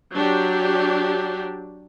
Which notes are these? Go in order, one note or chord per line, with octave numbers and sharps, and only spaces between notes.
F#3 D4 G4